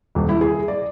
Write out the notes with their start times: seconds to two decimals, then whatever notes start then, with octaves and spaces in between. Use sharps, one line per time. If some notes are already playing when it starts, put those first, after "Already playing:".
0.15 D#1
0.29 E4
0.41 G#4
0.68 D5